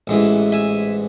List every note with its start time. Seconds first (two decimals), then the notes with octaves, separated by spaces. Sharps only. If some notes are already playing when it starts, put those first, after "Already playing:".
0.07 A1 G#2 E3
0.52 E5 G#5